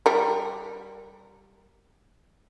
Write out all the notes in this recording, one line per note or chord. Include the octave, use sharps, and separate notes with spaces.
G3 A#4